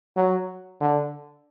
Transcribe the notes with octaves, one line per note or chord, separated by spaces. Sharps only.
F#3
D3